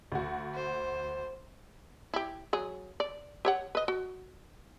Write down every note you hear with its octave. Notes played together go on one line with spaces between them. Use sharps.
D2 F#4
C5
E4 G4
F#3 G#4
D5
G4 C#5 F#5
B4 D#5
F#4